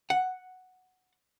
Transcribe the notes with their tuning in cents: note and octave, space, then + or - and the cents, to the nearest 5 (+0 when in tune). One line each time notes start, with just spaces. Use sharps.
F#5 +0